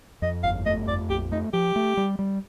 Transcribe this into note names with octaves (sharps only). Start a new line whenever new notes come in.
F2 D#5
G1 F5
A3 D#5
F2 D5
A#1 G4
A3 D#4
F3 G4
A3
G3
G3